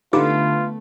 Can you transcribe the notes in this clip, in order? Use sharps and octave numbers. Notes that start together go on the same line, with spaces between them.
D3 A3 B3 D#4 F4 G4 B4 D6